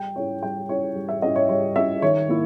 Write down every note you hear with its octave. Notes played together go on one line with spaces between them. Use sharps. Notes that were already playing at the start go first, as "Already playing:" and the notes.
Already playing: G3 G5
C#4 E4 C#5
G3 G5
C#4 E4 C#5
G3
E5
C#4 E4 D#5
C#5
G3 C#5
C#4 E4 E5
D#3 C#5
A#3 E4